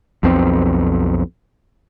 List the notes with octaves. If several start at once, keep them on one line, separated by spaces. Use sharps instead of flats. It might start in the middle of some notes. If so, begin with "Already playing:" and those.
B1 F2 B2 C4